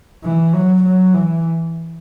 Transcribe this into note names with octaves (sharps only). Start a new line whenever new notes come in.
E3
F#3
F#3
E3